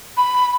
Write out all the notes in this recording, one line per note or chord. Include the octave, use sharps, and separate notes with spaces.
B5